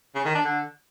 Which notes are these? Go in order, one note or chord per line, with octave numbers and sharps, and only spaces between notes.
C#3
D#3
D4
D3